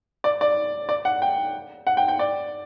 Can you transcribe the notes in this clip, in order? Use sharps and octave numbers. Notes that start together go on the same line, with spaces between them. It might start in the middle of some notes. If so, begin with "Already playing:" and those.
D5
D5
D5
F#5
G5
F#5
G5
G5
D5